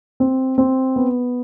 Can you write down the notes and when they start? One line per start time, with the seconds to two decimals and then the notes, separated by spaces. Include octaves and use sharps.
0.20 C4
0.58 C4
0.96 B3